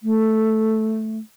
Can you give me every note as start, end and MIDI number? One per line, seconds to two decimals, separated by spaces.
0.03 1.18 57